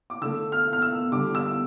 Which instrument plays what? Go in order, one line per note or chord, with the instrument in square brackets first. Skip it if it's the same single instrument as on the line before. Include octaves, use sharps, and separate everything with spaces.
[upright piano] D6
D3 A3 E6
F6
F6
E6
D3 G3 D6
E6